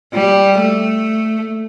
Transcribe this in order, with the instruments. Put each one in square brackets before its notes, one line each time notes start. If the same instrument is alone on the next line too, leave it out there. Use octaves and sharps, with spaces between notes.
[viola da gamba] G3
A3